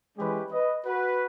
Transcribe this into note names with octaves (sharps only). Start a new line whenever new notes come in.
E3 G#3 C#4 G4 B4
B4 D#5
F#4 B4